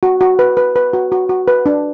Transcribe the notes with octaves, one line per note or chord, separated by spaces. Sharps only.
F#4
F#4
B4
B4
B4
F#4
F#4
F#4
B4
D4